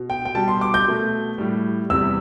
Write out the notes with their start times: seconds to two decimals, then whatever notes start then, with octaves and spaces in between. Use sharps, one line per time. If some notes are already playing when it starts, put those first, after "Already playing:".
Already playing: B2
0.10 G5
0.25 G5
0.35 B2 G3 A5
0.48 C6
0.61 D6
0.74 G6
0.87 B2 A3
1.38 A2 G3
1.90 E2 C3 G3 E6